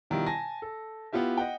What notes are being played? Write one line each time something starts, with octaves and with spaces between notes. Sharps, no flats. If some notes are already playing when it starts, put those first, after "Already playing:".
B2 D#3 F3 G3 E4 F4
G#5 A5 A#6
A4
B3 E4 F4 G4 E5
D#5 F#5 G5